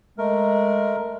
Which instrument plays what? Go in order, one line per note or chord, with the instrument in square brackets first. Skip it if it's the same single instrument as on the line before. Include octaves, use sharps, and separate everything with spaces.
[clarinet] G#3 [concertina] A3 A#4